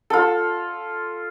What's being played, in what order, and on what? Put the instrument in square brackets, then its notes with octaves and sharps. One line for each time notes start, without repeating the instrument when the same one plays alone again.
[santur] F4 A4